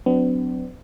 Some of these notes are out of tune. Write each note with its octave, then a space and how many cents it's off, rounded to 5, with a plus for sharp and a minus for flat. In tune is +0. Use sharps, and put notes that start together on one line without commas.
F#3 -15 B3 +45 D4 -15